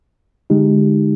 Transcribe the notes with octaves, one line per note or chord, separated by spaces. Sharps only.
D3 G#3 D#4 G4